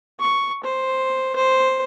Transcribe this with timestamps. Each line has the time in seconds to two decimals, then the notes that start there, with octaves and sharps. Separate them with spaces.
0.21 C#6
0.64 C5
1.36 C5